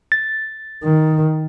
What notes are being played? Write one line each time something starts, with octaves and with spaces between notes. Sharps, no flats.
A6
D#3